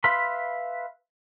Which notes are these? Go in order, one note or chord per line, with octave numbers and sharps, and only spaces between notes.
B4 E5 F5 B5 C6